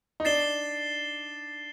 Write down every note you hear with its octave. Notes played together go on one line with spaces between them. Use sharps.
D#4
D4 A6 C7 E7 G7